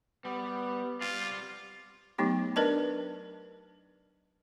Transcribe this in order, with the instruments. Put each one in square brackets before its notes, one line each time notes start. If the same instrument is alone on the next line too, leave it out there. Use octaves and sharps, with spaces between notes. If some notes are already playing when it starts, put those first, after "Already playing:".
[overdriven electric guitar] G3 [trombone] B3
[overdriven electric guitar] G3 C4 [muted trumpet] F4
[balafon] F#3 A3 B3 D#4 G4
D4 A#4 B4 D5 D#5 A5